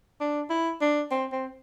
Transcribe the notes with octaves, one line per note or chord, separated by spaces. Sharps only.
D4
E4
D4
C4
C4